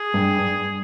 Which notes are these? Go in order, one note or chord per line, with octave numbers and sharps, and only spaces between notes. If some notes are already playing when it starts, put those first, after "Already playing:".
Already playing: G#4
G2